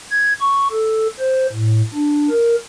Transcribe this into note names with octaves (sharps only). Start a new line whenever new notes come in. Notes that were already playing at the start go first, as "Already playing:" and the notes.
G#6
C#6
A4
C5
A2
D4
A#4